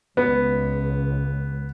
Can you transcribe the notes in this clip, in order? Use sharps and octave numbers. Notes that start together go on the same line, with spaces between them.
C#2 B3